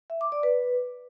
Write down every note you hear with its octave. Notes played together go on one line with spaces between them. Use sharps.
E5
D6
D5
B4